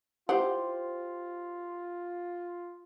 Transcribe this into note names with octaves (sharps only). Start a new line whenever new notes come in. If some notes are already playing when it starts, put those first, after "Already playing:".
E4 F4 G4 C5 F#5